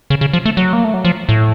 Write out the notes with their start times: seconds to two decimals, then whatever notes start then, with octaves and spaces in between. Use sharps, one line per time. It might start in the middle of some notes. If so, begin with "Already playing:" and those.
0.10 C#3
0.21 C#3
0.33 F3
0.46 A3
0.57 F#3
0.73 A#3
0.84 A3
0.94 F#3
1.05 F3
1.29 A2